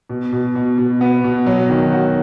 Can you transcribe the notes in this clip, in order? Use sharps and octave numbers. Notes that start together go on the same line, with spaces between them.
B2
B2
B2
B2
B3
B2
F#3
D#3
F#4